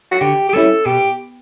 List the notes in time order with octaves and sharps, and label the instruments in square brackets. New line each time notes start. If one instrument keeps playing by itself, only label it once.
[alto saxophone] F#4
[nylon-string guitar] D3 [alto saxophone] G4
[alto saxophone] G4
[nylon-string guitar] G3 C#4 E4 [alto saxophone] A4
[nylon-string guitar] B2 [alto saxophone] G4